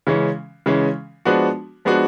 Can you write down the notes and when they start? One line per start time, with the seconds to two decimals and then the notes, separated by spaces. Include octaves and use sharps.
0.07 C#3 E3 G#3 C#4
0.66 C#3 E3 G#3 C#4
1.25 F3 G#3 B3 D4 F#4
1.85 F3 G#3 B3 D4 F#4